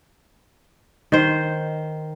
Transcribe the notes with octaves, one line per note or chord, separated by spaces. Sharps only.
D#3 C5